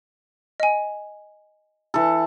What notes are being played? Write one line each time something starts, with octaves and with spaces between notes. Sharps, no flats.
D#5 G#5
E3 A4